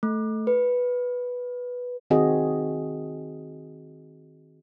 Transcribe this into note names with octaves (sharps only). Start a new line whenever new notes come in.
A3
B4
D#3 C4 F#4 G#4 D#5